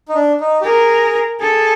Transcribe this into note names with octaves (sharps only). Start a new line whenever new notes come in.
D#4
D4
D#4
G4
G#4 A#4
G#4 A4